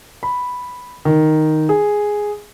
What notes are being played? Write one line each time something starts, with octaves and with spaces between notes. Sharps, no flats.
B5
D#3
G#4